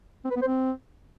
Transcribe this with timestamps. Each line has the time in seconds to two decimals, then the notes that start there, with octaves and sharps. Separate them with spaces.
0.25 C4
0.30 B4
0.36 B3
0.42 C5
0.47 C4